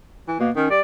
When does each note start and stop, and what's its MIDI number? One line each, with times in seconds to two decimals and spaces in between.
0.28 0.36 52
0.40 0.50 47
0.40 0.50 58
0.56 0.70 51
0.56 0.69 61
0.70 0.80 55
0.70 0.81 74